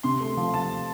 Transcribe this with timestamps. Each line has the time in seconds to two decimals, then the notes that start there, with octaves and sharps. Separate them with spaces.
0.03 C3 C6
0.21 A3
0.37 F3
0.54 F3 A5